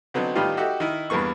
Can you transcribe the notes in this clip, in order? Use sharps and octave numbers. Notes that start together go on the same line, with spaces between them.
D3 F#3 B3 C4 D#4
A2 D#3 G3 B3 F4 G4
D#4 F#4 G4 A4 E5
D#3 E4
E2 G2 E3 A#3 C#6